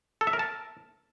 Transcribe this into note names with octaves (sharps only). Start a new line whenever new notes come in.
A4
E5
A#4
A5